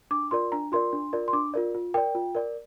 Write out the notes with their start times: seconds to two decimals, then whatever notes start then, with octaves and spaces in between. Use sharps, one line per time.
0.11 D4 D6
0.31 F4 A#4 D5 C6
0.52 D4 A#5
0.72 F4 A#4 D5 C6
0.93 D4
1.13 F4 A#4 D5
1.28 C6
1.33 D4 D6
1.54 F4 A#4 D5
1.74 F4
1.94 A#4 D5 G5
2.15 F4
2.35 A#4 D5